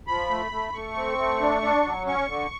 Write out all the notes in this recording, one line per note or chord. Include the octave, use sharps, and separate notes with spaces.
F3 B5
A3
A3
A3 C#6
C4
A3
D4
D4
F#3
C#4 C#6
D3